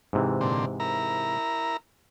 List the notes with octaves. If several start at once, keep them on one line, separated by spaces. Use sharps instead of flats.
G#2 C3 E3
A#2 D3 C4
E4 A#4 A#5